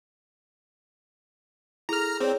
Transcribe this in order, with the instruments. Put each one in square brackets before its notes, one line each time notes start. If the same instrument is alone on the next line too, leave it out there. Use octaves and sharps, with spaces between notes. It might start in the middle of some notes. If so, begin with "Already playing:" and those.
[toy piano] E4 G#4 A4 [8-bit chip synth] A#5 F6
[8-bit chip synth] C4 [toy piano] G#4 C#5 D5